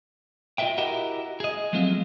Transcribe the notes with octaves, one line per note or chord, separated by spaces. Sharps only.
F4 F#4 B4 D#5 E5 G5
E4 F#4 G4 A#4 D#5 F#5
G#4 D#5
F3 F#3 G#3 A3 C4 F4